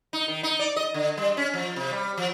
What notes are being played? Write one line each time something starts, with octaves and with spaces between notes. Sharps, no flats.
D#4
D#3
D#4
D5
D#5
D3
G3
C#4
F3
C3
G3
F3